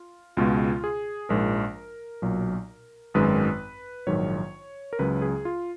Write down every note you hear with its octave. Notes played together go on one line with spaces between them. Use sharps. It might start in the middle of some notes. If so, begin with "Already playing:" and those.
Already playing: F4
C#2 B2 G#3 F4
G#4
A#1 G#2 F3 G#3 A#4
B1 A#2 F#3
G#1 F#2 D#3 G#3 B4
A#1 G#2 D#3 F#3 C#5
A#4
C#2 C#3 F#3 B4
G#4
F4